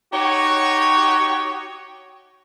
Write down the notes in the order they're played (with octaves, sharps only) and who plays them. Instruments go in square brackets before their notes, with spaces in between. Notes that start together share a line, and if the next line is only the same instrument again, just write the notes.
[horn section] D#4 F#4 G4 C#5